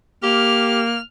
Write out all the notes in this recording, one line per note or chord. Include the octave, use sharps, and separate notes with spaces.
A#3 G4 F6